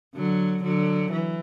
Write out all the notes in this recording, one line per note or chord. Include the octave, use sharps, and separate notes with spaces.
D3 F#3
D3 F#3
E3